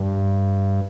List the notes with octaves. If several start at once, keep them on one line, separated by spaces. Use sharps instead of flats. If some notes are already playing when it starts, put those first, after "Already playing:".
Already playing: G2